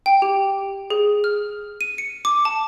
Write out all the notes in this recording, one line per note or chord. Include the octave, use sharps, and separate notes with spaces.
G5
G4
G#4
F6
D#7
C#7
D6
A5